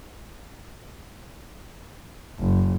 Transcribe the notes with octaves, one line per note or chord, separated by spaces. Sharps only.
F#1